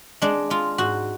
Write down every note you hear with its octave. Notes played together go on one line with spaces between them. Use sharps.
G#3 D4
G#3 F4
G#2 F#4